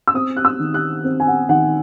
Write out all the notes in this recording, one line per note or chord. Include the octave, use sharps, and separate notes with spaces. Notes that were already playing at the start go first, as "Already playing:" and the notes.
E6
C4 D#6
F#6
E6
D#3
F#6
C4
G#5
F#5
D#3 F#5